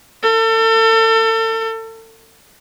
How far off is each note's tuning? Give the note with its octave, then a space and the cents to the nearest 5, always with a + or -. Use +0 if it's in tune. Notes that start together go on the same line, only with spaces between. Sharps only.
A4 +35